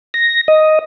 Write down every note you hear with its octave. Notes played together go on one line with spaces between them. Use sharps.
A#6
D#5